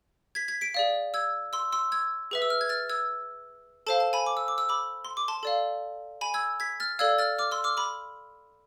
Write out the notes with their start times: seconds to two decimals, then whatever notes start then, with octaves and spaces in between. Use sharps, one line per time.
0.35 G#6 B6
0.48 G#6 B6
0.61 B6 D7
0.74 G#4 D5 F5
1.14 E6 G#6
1.53 C6 E6
1.72 C6 E6
1.92 E6 G#6
2.31 G#4 B4 E5
2.42 E6
2.50 F6
2.61 G#6
2.69 F6 A6
2.89 E6 G#6
3.87 A4 C5 F5 A5
4.00 A5
4.13 G#5 B5
4.27 D6
4.37 E6
4.48 D6
4.58 E6
4.69 B5 D6
5.05 C6
5.17 D6
5.28 A5 C6
5.43 A4 D5 F5
6.21 G#5 B5
6.34 E6 G#6
6.60 G#6 B6
6.80 F6 A6
6.99 A4 D5 F5 E6 G#6
7.19 F6 A6
7.38 D6 F6
7.51 C6 E6
7.64 D6 F6
7.77 B5 D6